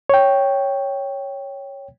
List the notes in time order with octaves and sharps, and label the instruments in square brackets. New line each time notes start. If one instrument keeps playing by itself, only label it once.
[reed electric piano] C#5 G5